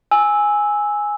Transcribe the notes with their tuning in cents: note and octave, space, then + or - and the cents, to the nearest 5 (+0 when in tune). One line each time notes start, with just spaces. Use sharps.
G#5 +0 E6 -10